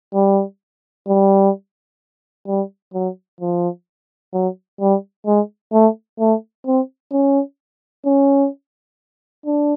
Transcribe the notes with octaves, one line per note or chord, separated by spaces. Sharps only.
G3
G3
G3
F#3
F3
F#3
G3
G#3
A3
A3
C4
C#4
C#4
D4